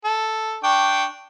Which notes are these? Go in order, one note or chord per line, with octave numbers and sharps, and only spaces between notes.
A4
D4 G5 C#6